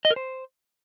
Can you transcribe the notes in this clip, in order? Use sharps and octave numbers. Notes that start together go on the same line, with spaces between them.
D#5
A#4
C5